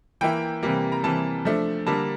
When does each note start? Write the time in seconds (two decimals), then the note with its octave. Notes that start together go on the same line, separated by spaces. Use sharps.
0.21 E3 A#3 E4 G5
0.63 C3 E3 G3 A#3
0.92 A#5
1.04 C3 E3 G3 A#3 A5
1.45 F3 A3 D4
1.86 D3 G3 A#3 D4 A5